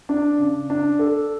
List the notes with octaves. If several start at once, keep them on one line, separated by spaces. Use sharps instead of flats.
D4
C#3
D4
A4